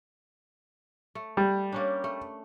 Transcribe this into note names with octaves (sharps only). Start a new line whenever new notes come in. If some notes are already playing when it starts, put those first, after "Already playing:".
A3
G3
A#3 C#4 D4
A3